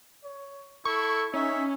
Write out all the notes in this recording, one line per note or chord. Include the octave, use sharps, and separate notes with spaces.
C#5
E4 A4 C#6
C#4 D#4 E5